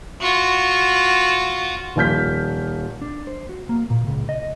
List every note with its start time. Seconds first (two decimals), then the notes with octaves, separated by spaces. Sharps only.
0.21 F4 F#4
1.96 D#1 F3 F6 G6 B6
3.01 D4
3.27 C5
3.49 F#4
3.69 A#3
3.90 A#2
4.07 C#2
4.29 D#5